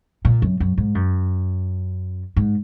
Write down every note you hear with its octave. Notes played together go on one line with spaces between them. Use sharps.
A#2
F#2
F#2
G#2
F#2
G#2